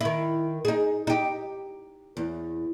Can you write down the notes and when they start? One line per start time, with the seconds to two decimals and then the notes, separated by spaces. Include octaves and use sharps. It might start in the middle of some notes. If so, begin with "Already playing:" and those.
0.01 D#3 E4
0.65 D#4 G#4
1.07 D#4 G4
2.17 E2